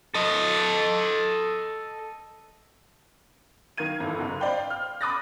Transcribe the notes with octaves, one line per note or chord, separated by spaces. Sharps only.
A4 D#5
D#3 A#4 F5 G#6 D#7
G#1 E3 A4
F#1 G#2
C5 D5 F5 G5 B5
F6
B5 D6 D#6 F#6 A6 A#6